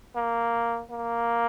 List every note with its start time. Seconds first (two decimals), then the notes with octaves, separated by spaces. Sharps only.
0.16 A#3
0.90 A#3